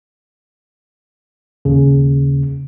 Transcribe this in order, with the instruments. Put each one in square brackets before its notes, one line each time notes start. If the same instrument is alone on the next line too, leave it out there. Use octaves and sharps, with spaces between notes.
[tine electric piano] D#2 C#3